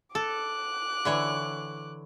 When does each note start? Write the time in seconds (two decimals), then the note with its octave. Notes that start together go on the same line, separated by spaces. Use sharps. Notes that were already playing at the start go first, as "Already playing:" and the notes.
0.15 A4 D6 F#6
1.05 D3 E3 C#5